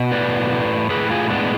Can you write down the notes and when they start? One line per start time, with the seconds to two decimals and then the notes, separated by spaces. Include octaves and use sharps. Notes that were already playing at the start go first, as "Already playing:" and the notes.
Already playing: B2
0.11 A2 B4 D5
0.51 A2
0.90 A2 G#4 B4
1.10 F4 G#4
1.30 G#3 B3 D4